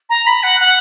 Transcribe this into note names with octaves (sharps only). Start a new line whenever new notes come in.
A#5
B5
F#5
F#5